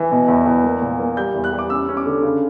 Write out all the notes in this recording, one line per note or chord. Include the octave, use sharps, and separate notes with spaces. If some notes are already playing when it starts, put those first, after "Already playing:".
Already playing: E3
B2
E2
E2
A#3
A#2
A#3
G3 G6
E2
F#6
G3
D6
C#4 E6
C#4
D6
D3
C#3